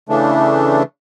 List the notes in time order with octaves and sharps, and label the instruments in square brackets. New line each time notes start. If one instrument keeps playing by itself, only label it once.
[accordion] C#3 E3 A3 D4